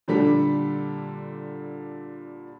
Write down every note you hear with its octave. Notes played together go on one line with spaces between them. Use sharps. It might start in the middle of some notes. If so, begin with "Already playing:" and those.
A#2 D3 G3 D4 A4 B6